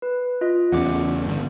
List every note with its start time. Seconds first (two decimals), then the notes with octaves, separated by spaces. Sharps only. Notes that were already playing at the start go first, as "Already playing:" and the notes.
0.02 B4
0.41 F4 D#5
0.72 E2 C#3 F#5 D6
1.26 G1